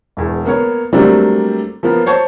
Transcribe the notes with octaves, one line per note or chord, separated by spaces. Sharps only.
E1 E2
A#3 B3 C#5
F#3 G3 A3 A#3 C4 D4
F3 A#3 B3
C5 C#5 A5 C#6